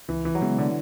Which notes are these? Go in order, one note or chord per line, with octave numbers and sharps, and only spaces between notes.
C#2 E3
E3
F#3
C#3 E3 G#3 B3 E4
D3